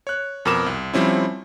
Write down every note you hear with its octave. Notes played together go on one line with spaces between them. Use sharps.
C#5 F#6
F2 B2 A#4 D6 E7
C2
F3 G3 C4 C#4 E4